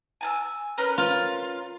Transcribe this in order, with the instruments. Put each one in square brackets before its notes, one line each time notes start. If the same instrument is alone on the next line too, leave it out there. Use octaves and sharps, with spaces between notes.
[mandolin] G#5 A5 E6
C#4 A#4 B4
[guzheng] F4